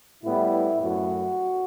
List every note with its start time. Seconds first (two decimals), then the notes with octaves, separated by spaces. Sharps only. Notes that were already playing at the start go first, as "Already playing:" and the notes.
0.24 A2 G3 B3 E4
0.81 F#2 A3 F#4